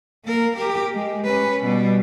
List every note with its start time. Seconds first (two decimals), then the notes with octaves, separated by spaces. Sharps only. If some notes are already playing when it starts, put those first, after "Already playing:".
0.25 A#3 A#4
0.57 G4 A#4
0.94 G#3
1.25 C#4 B4
1.64 B2 G3